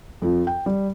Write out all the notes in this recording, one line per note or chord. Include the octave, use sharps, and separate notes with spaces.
F2 F3
G5
G3